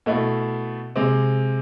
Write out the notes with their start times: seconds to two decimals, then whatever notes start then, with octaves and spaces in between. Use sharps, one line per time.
0.06 B2 A3 E4
0.96 C3 G#3 C4